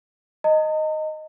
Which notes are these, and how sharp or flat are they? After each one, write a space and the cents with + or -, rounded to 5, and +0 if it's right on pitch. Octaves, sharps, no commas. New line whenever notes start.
D#5 +0 A#5 -45